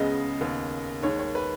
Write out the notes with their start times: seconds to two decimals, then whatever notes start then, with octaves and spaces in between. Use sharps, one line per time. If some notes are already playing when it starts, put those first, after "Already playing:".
Already playing: C#2 C#3 G#3 B3 D#5
0.41 D#2 C#3 B3
1.03 D#2 D#3 G#3 C#5
1.19 C#5
1.35 B4